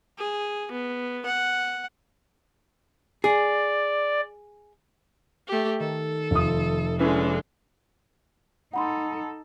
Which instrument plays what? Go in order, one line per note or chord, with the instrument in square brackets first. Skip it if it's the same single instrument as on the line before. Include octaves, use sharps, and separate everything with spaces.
[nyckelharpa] G#4
B3
F#5
[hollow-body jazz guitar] G#4 [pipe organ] D5
[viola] A3 G4
[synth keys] D#3 [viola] A4
[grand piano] F1 F4 D#6
[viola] D3 G#3 [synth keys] C#4 E4 B4
[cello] D#4 A4 [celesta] F#5 B5 C6